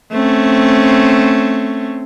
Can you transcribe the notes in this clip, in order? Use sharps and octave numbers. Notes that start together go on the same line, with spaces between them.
A3 C4 C#4